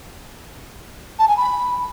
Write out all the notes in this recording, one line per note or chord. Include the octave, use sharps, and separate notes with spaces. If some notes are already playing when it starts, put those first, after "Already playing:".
A5
G#5
B5